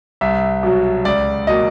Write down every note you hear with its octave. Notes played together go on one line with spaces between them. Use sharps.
C2 E5
B2 F#3
C#2 D5
B2 F#3 A#3 D#5